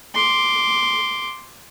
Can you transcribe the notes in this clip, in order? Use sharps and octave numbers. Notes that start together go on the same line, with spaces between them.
C6 D6